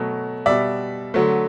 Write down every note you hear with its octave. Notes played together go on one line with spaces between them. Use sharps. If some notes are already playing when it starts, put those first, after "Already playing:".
Already playing: B2 F#3 A3
B2 G3 D5 E5
D3 F#3 A3